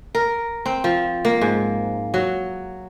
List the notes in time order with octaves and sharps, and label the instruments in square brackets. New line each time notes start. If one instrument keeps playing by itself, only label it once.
[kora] A#4
C4
F3
A#3
G#2
F#3